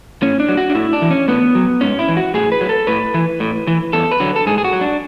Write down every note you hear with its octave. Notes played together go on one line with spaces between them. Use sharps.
A2 C#4
D4
F#3
F#4
D4
A2 E4
D4
E3
C#4
A2 B3
F#3
G#2 C#4
E4
E3
F#4
A2 G#4
B4
F#3
A4
A2 B4
E3
A2
E3
E2 A4
B4
D3 F#3
A4
G#2 G#4
G#4
F#4
F#3
D4